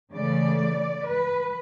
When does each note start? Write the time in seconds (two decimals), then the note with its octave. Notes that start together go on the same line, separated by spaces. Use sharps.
0.13 C#3 E3 A3 D5
1.05 B4